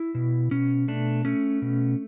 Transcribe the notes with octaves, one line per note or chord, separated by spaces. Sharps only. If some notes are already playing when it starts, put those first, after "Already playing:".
Already playing: E4
B2
B2 C#4
A3 D4
A3 C#4
B2